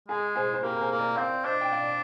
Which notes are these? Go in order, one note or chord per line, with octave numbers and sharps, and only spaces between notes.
G#3 G#4
G#4 C5
C5
A#3 G4 A#4
A#4
G#4 C5
A#3
A#4 D5
C4 D5 F5
D4 C5 D#5
G5
D5 F5